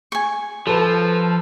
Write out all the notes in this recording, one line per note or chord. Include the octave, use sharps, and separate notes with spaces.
G#5 C#6
F3 A4 B4